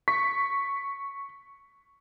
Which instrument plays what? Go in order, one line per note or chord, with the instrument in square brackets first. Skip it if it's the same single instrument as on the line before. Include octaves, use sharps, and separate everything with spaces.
[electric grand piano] C#6 B6